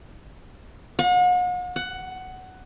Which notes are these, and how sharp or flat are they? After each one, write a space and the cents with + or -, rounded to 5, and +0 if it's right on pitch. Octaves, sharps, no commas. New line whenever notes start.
F#5 -45
F#5 +10